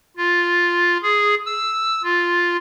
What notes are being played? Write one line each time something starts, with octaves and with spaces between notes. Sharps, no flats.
F4
G#4
E6
F4